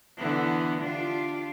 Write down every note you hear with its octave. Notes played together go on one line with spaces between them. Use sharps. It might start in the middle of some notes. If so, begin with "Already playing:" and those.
D3 E3 B3
D4 F4 G4